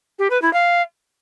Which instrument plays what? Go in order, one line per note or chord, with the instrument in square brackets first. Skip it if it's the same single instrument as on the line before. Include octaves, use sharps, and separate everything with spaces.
[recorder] G4
B4
E4
F5